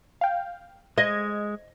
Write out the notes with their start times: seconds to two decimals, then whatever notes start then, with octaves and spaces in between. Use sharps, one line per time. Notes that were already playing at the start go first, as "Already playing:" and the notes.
0.21 F5 G5
0.98 G#3 D#5 G#6